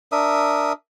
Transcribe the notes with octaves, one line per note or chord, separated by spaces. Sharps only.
D4 A#4 E5 D#6